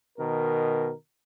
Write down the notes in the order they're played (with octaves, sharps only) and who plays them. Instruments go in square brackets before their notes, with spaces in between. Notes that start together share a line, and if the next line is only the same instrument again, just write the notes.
[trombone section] B2 D#3 A#4